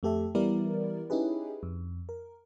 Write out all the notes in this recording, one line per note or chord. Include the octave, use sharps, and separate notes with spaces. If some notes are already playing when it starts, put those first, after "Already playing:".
F2 A3 G4 A4 E5
E3 G3 B3 E4 A#4 D5
C#4 D#4 E4 G4 G#4 B4
F2
A#4